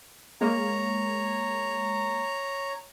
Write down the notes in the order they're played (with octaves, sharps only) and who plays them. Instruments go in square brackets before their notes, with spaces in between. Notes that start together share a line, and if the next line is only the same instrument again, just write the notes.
[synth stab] G#3 A#3 [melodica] C#5 A#5